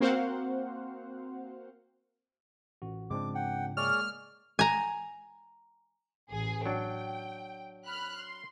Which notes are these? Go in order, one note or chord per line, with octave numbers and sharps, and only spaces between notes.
A#3 C4 F#4 C5 F5 F#5
A1 F#4
G#2 C#3 F3 G#3 C4 D4 D6
F#5 G5
G#3 A#3 G#4 C#5 D5 F6
G#5 A#5
A1 G#4
F#3 D4 G5
B5 F6 F#6
C6